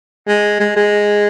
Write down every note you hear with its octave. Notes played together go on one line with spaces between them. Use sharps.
G#3
G#3
G#3